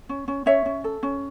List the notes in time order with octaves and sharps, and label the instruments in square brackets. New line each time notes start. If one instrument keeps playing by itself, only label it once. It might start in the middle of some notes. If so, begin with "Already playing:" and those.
[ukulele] C#4
C#4
C#4 C#5 E5
C#4
A4
C#4